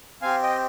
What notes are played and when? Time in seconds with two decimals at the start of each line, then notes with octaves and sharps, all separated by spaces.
0.22 C4 G4 F5 G#5
0.43 D#5 G5